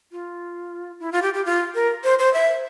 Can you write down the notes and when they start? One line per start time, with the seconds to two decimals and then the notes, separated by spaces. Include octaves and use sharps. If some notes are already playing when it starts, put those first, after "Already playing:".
0.12 F4
1.00 E4
1.12 F4
1.22 G4
1.34 G4
1.45 F4
1.75 A#4
2.04 C5
2.19 C5
2.34 E5